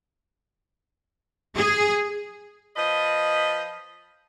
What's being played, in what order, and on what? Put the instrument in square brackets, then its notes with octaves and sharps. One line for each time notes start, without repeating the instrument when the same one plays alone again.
[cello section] G#4
[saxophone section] F3 B4 D#5